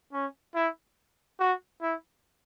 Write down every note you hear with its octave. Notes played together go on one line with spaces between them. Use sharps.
C#4
E4
F#4
E4